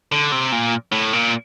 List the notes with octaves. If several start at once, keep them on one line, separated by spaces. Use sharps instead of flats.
D3
C3
A#2
A2
A#2